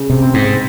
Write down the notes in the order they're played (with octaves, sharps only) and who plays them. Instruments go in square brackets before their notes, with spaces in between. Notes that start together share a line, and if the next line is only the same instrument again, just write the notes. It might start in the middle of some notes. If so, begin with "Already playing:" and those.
Already playing: [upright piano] C#3
[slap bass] C3
[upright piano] C4
[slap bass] G#2